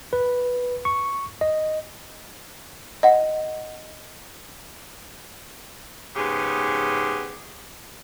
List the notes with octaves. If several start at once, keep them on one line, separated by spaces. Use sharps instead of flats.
B4
C#6
D#5
D#5 F#5
G#2 C#3 B3 G4 G#4